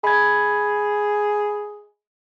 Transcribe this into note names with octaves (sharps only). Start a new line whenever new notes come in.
G#4 B5 G#6